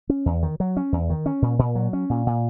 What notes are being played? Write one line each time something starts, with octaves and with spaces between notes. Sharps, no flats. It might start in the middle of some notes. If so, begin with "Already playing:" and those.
C#4
E2
D#3
F#3
C#4
E2
D#3
C#4
A#2
A#2
F#3
C#4
A#2
A#2